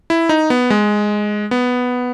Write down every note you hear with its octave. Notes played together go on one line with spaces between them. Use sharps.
E4
D#4
B3
G#3
B3